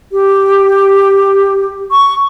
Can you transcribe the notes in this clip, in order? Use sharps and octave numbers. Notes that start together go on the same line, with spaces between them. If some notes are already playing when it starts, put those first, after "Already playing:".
G4
C#6